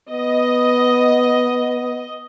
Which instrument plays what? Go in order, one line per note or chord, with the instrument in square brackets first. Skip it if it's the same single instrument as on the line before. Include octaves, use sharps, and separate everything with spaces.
[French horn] B3 [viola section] D#5